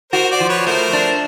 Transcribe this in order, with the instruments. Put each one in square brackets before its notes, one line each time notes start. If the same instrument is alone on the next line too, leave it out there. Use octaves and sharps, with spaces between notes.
[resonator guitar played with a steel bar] F#4 [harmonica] A#4 C5
[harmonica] C5 D5
[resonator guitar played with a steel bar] F3
[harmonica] B4 C#5
[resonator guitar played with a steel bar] A3 [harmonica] A#4 C5
[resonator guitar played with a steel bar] D4